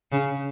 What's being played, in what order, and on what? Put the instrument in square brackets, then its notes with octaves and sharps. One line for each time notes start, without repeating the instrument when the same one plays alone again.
[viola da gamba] C#3